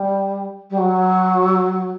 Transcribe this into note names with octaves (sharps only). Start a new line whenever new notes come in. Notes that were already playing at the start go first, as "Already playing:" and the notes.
Already playing: G3
G3
F#3